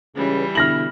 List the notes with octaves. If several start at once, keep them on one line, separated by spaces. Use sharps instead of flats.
C#2 E3 G3
B2 D3 E4 F6 A#6 F#7